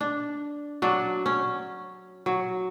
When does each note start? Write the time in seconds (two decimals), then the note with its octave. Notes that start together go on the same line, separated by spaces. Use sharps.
0.01 D4
0.82 F#3 D4
1.26 C#4
2.26 F#3